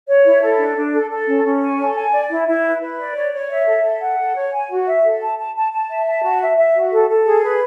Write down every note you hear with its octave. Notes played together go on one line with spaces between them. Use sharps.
C#5
E4
A4
D4
D4
A4
A4
C#4
C#4
G#5
A4
G#5
D5
E4
E4
B4
B4
D5
C#5
C#5
E5
A4
A4
F#5
A4
C#5
G#5
F#4
E5
A4
A5
A5
A5
A5
E5
A5
F#4
E5
E5
F#4
A4
A4
G#4
B4